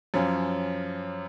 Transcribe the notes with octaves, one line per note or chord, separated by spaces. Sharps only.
F#2 F3 C#4